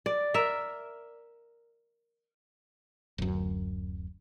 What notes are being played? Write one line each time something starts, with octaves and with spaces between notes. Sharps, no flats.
D5
A#4 E5
D1 F#2